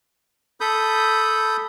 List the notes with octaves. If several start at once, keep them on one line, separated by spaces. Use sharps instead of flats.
A4 B5 D#6 G6